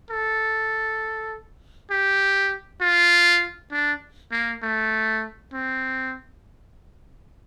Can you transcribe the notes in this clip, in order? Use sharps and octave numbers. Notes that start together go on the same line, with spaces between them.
A4
G4
F4
D4
A#3
A3
C4